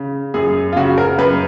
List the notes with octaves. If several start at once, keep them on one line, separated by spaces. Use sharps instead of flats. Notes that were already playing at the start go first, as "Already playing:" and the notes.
Already playing: C#3
F#2 G#4
F4
C#3 F#4
A#4
F#2 B4